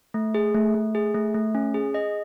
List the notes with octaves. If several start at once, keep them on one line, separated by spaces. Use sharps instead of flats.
A3
G#4
A3
A3
G#4
A3
A3
C#4
G#4
D#5